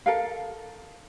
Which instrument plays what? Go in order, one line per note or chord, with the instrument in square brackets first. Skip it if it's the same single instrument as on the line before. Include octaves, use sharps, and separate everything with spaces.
[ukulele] A4 A#4 F5